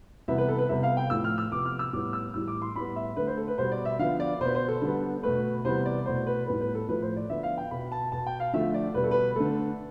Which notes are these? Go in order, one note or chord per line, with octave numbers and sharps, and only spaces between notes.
C3 E3 G3 B3 E5
B4
A4
B4
C3 G3 B3 E5
F5
G5
A2 F3 A3 E6
F6
E6
C3 F3 B3 D6
F6
E6
A2 G3 B3 D6
E6
A2 E3 G3 E6
D6
C6
A2 G3 B3 B5
E5
D3 A3 B4
C5
A4
B4
B2 G3 B3 C5
D5
E5
D3 F3 B3 F5
D5
B2 B3 C5
C5
A4
D3 G3 B3
B2 A3 B4
C3 E3 G3 B3 C5
D5
B2 A3 C5
B4
A2 G3 B3 B4
B4
A4
A2 F3 A3 B4
C5
D5
D3 F3 B3 E5
F5
G5
B2 B3 B5
A5
B2 B3 A5
G5
F5
D3 F3 A3 E5
D5
B2 G3 B3 B4
A4
B4
D3 A3 A4